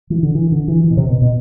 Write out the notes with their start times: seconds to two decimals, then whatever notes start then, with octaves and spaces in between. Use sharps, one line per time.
0.10 E3
0.23 D3
0.35 E3
0.52 D3
0.68 E3
0.84 E3
0.91 B2
0.97 C3
1.09 B2
1.22 B2